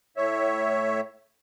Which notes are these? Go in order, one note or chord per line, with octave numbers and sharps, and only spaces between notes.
A2 C#5 E5